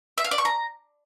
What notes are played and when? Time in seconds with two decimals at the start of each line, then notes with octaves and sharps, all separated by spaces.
0.18 E5
0.24 F5
0.31 D5
0.38 C#6
0.45 A#5